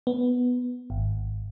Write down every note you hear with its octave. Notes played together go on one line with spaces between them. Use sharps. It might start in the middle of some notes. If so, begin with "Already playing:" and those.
B3
G#1